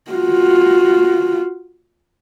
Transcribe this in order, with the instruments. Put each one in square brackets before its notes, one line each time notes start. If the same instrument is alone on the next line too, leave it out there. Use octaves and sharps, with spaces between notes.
[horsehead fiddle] F4 F#4